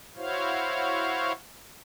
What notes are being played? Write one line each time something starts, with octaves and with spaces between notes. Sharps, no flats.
E4 F#4 C5 C#5 F5